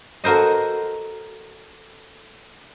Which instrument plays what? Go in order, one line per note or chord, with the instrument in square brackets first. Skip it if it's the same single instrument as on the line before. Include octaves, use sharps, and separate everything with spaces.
[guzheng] F#4 A4 A#4 C5 D#5